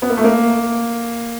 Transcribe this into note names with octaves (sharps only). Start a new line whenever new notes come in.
B3
A#3
A3
A#3